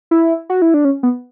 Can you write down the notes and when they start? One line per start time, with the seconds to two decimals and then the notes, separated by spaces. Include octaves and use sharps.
0.11 E4
0.50 F#4
0.62 E4
0.74 D4
0.85 C#4
1.03 B3